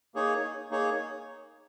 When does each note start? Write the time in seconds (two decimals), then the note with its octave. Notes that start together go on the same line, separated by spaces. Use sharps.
0.15 A#3 D#4 G#4 C#5
0.71 A#3 D#4 G#4 C#5